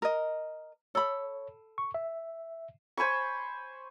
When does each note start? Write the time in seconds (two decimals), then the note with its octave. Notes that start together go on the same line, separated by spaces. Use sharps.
0.02 A#4 D#5
0.95 A4 C#5 B5
1.78 C#6
1.94 E5
2.97 C5 G#5 B5 C#6